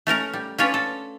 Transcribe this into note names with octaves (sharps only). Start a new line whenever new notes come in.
A3 C#4 A#4 A#5
G3
C#4 D4 F4 B4 C#5
A4